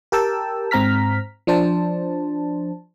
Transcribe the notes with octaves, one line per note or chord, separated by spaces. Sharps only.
G4 A#4 G5 A5 E6
G#2 C4 A#5 F6 B6
F3 D4 C5 A5